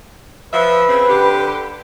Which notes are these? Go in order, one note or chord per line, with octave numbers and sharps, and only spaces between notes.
F3 B4 E5
C#3 C4
D3 G4